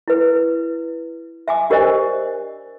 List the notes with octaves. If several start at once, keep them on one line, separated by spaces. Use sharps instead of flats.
E4 B4
E5 G#5 D6
D4 G4 A#4 C5 D5 D#5